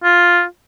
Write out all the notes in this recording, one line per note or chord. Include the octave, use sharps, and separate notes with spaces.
F4